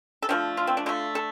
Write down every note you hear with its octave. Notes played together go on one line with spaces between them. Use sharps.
A4
D3 F3 A3 G4
F4
C4
D4
D3 A3 F4
A4